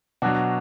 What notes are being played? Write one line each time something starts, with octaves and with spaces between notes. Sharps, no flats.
B2 F#3 D4 F#4